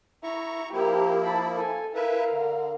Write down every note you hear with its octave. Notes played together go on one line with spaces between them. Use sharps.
E4 A#5 C#6
F3 A#3 E4 G4 A#4
A5 B5
A4 G#5
E4 A#4 B4 E5 F5
D3